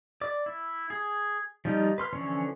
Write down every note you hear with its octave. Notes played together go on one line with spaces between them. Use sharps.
D5 D6
E4
G#4
F3 G3 D#4 F4
B4 C6 F6
D3 E3 F3 C#4 C#5